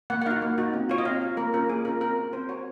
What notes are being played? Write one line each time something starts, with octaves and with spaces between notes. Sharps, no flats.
A#3 F#5
F#5
D#4 F#4 F5
A#3
D#4 F#4
C4
F4 C#5
D#5
C4 F5
F4
A#3 A#4
C#4 F4 A#4
A#3 G#4
C#4 F4 A#4
C4 A#4
F#4
C4 C5
F#4 C#5